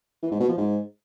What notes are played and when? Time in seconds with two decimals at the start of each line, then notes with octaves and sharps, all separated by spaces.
0.22 E3
0.31 G#2
0.40 B2
0.49 F3
0.58 G#2